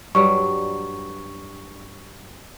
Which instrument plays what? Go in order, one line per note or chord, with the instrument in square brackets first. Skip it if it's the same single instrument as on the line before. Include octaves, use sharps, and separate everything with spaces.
[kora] G2 F#3 G3 [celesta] C#6